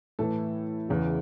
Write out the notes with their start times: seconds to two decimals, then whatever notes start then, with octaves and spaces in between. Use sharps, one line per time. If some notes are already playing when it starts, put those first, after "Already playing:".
0.19 A2 E3 A4
0.89 E2 C#3 E3